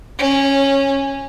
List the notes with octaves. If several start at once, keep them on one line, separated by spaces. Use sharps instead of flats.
C#4